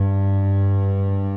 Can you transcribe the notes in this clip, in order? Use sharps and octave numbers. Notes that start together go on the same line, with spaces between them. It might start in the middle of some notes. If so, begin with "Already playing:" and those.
Already playing: G2